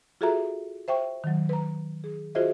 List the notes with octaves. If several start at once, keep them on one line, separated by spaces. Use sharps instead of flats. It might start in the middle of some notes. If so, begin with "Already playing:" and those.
F4 F#4 G#4 A4 E5 A#5
C5 E5 G5 C#6
D#3 F#3
B4 A#5
G#4
F4 F#4 G#4 C5 D#5 E5